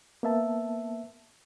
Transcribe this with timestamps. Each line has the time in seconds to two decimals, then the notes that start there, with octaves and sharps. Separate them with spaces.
0.23 A#3 B3 E5 A5